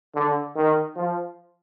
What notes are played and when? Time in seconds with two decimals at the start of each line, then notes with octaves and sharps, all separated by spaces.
0.15 D3
0.56 D#3
0.96 F3